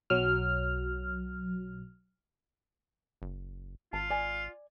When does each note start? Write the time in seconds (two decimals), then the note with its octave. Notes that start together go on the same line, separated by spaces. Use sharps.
0.10 B1 F#3 F6
3.22 F#1
3.93 G#1 F4 A5
4.10 D5 G#5